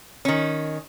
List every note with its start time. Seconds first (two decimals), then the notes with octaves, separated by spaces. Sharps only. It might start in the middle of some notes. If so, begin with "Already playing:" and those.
0.25 D#3 C#4